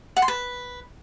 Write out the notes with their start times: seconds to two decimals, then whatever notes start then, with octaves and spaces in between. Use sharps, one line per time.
0.17 F#5
0.22 C6
0.28 B4